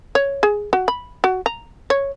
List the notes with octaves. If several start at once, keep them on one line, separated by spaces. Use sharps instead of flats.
C#5
G#4
F#4
B5
F#4
A#5
C#5